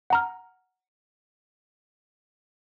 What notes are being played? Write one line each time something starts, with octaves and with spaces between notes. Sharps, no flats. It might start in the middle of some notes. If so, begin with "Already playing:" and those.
F#5 A#5 F6